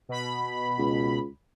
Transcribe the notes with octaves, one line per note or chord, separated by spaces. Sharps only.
B2 B5
C#2